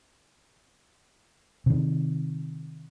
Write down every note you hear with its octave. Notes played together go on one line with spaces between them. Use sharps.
C3 D#3